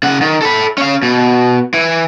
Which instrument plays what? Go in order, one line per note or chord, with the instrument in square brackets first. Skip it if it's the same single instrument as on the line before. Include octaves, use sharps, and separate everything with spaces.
[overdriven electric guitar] C#3 F#5
D#3
A4 B5
C#4 F5
B2
E3